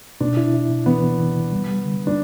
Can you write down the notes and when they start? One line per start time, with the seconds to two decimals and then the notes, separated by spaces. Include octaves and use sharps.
0.21 B2 D4
0.37 E4
0.54 E4
0.69 B2
0.86 E3 B3
1.02 E3
1.19 E3
1.36 C3
1.52 G3
1.68 G3
1.84 D3
2.01 D3
2.07 D4